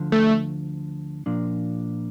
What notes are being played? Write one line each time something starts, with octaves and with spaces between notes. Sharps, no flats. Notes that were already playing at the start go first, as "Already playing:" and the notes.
Already playing: D2 D3 F3
A3
A#2 F3 A#3 D4